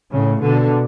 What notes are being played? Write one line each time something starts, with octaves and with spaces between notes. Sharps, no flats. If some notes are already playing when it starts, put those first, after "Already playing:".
A2 C#3
B2 D3